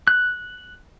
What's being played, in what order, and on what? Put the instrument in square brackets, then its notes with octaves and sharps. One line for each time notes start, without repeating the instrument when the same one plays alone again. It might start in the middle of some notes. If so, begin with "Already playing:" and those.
[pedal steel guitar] F#6